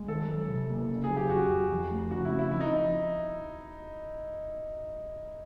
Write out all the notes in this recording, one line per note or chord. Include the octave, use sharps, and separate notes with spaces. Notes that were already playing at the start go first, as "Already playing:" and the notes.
Already playing: G#3
D#3 A4
F#3
C3
A#3
C#3
G#4
F#3
G4
F2 F#4
F2
F3
A3
C#3 F#4
E4
C4
E4
F3 E4
D#4